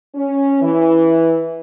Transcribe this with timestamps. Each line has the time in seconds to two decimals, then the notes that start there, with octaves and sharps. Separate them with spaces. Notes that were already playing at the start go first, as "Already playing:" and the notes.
0.15 C#4
0.62 E3